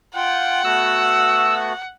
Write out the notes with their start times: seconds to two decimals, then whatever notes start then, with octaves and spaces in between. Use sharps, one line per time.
0.16 F4 F#5 G5
0.64 A3 B3 F#4 E6